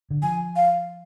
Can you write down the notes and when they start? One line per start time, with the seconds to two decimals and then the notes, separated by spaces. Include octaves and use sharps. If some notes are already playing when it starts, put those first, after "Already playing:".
0.10 D3
0.22 F3 G#5
0.56 F5